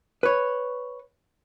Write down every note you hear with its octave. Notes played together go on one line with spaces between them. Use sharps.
B4 C#5